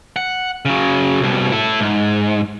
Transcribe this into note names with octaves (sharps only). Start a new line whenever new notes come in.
F#5
C#3 F#3
C2 B2
E4 A4
G#2